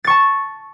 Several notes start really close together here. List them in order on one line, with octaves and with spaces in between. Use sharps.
A6 C#6 A5